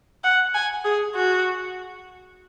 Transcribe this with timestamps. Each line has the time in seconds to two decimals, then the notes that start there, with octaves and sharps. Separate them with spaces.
0.24 F#5
0.54 G#5
0.84 G#4
1.15 F#4